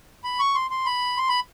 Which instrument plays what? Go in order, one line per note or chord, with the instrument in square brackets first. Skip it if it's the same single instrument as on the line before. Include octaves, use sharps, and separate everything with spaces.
[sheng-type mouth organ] B5
C#6
C6
C6
B5
C6
B5